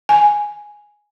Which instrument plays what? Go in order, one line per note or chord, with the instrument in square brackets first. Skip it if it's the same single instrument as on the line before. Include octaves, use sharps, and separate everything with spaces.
[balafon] G#5